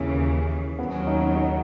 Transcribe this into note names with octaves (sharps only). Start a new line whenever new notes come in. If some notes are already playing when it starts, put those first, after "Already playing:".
Already playing: D#2 C#3 E3 C#4
D#2 C#3 F#3 B3
C#4
D#4
D#4
D#4